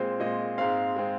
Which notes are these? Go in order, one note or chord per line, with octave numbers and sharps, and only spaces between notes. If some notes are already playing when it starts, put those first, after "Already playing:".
Already playing: A#2 G#3 C4 C5
A#2 G#3 C4 D#5
G#2 G#3 C4 F5
G#3 C4